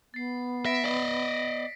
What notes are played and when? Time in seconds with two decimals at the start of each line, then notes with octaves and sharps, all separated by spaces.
0.14 B3 A6 C7
0.65 E5 A#6 B6 D7
0.84 D5 D#5